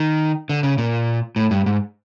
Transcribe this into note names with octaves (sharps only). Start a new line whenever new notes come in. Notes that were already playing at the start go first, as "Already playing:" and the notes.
Already playing: D#3
D3
C#3
A#2
A2
G2
G#2